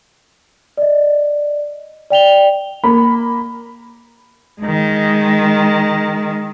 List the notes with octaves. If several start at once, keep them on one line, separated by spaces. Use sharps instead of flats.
D5 D#5
D5 G5 F7 G7
A#3 B5
D#3 G#3